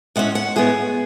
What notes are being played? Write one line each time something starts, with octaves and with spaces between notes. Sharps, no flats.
A2 G#3 C#4 F#5
F#5
A2 G#3 B3 G#4